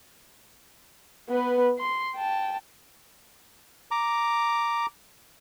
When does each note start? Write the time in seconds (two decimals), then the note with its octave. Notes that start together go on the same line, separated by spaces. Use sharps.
1.29 B3 B4
1.79 C6
2.15 G5 A5
3.91 A#5 D6